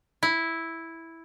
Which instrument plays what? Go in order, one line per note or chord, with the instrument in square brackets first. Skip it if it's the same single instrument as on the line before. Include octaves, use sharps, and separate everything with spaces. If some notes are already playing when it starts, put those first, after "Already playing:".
[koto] E4